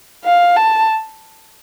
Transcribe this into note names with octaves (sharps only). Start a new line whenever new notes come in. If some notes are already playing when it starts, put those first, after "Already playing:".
F5
A5